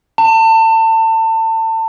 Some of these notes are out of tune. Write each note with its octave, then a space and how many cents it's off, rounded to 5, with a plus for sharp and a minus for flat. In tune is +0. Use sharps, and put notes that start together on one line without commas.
A5 +30